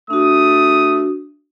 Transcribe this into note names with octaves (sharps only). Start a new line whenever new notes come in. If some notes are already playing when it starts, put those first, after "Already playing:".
A3 D4 F#4 D#6